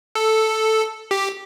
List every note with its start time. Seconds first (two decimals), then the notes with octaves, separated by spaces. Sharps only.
0.15 A4
1.11 G4